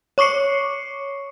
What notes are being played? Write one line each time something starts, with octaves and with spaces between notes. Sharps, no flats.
C#5 C#6 D6 C7 C#7